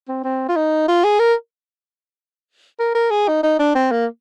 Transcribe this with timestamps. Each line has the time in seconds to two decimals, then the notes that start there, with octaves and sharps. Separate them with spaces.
0.09 C4
0.24 C4
0.49 F4
0.56 D#4
0.88 F4
1.04 G#4
1.19 A#4
2.79 A#4
2.95 A#4
3.11 G#4
3.28 D#4
3.43 D#4
3.60 D4
3.75 C4
3.92 A#3